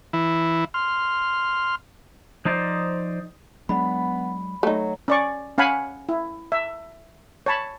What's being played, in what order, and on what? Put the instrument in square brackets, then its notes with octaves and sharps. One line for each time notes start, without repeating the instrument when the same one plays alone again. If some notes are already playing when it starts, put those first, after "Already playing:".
[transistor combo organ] E3 E4
C6 F6
[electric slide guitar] F3 D#4 C5 D5
[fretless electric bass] F#3 G#3 D4 [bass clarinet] B3 [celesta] B5
[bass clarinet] F#3 [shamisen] A3 D#4
[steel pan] C#4 D5 C#6
C#4 F5 F#5 G#5 B5
E4
E5
C#5 A5 B5